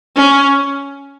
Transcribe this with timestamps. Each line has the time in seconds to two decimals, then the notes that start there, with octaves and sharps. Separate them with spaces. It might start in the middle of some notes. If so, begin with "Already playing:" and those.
0.16 C#4